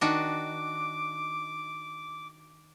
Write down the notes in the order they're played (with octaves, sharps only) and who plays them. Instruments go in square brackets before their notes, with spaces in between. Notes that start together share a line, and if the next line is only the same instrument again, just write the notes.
[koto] D#3 D4 F#4 [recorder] D6